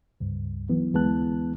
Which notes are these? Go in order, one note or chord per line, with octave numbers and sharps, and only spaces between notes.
C#2 G2
E3 F#3 B3
D2 E3 G#3 B3 A5 F#6